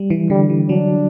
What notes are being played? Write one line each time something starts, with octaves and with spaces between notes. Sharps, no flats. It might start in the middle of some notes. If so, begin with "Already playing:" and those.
Already playing: G3
E3
D3 G3
E3
F#3 D4